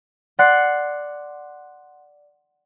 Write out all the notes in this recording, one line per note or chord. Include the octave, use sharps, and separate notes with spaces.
D5 F#5 C6 F#6 C7 C#7